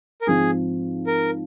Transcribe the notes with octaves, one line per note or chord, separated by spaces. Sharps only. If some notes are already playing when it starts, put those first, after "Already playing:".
A#4
G#2 F3 C4 G#4
A#4